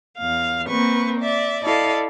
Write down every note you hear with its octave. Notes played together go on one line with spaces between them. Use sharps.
E2 F5
A#3 C4 B4 C#6
D5 E5
E4 A4 D5 D#5 F5